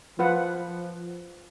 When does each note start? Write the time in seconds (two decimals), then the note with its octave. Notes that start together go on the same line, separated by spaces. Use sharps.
0.19 F3 F4 B4 F#5